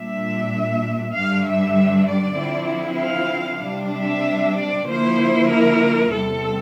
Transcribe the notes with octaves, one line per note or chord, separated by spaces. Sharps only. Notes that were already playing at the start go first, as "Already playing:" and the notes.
Already playing: A#2 G3 D4 E5
G2 D3 G3 D4 F5
E5
D5
D3 F3 C4 E4
F5
C3 G3 D4
E5
D5
D3 F3 A#3 E4 C5
A#4
E2 C3 G3 A4